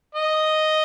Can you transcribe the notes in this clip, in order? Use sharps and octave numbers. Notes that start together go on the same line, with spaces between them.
D#5